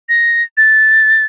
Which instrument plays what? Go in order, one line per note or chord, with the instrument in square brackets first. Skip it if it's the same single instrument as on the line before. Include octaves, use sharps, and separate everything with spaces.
[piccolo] A#6
A6